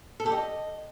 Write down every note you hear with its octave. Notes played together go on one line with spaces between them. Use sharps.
A4
G4
D#5